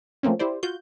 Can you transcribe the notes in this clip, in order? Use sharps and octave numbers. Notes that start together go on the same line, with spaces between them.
F3 A3 A#3 C4 C#4
E4 G4 C5 D5
F4 F#4 G6